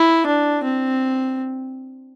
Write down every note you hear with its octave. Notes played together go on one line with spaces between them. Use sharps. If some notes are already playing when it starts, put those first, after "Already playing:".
Already playing: E4
D4
C4